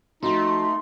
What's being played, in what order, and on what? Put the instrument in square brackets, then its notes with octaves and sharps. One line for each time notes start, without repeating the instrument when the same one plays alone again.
[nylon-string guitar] F3 F#4 [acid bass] A3 [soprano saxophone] D#4 [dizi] C6